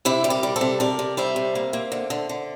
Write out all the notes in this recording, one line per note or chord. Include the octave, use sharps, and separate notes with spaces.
C3 E4 G4
G3
G4 A#4
G3
A4 C5
C3
C3 A#4 D5
C3
G3 C5 E5
C3
A#3
A#3
D3
D3
D3